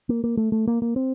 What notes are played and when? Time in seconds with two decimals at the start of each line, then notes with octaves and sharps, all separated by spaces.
0.09 A#3
0.24 A#3
0.37 A3
0.52 A3
0.67 A#3
0.82 A#3
0.96 C4